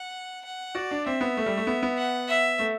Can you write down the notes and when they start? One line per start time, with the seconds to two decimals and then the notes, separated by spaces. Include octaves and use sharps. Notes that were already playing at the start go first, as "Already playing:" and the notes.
Already playing: F#5
0.45 F#5
0.75 F#4 D5
0.91 D4
1.06 C4 E5
1.21 B3
1.37 A3
1.46 G3
1.57 A3
1.67 B3
1.83 B3
1.98 F#5
2.28 E5
2.59 A3